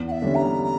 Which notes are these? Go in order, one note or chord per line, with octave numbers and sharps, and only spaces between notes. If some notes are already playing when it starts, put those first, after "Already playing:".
Already playing: E2
F#5
E5
D3 G3 C#4
A#5
A#5